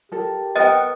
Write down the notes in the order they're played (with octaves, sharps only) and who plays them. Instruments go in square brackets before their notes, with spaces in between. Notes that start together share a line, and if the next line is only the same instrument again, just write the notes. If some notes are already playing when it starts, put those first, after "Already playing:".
[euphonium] G4 [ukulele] A4 A#4
[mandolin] B3 A#4 F#5 [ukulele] C5 G5 [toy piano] D#5